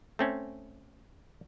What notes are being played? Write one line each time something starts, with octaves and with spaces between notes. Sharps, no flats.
A3 C4 C#4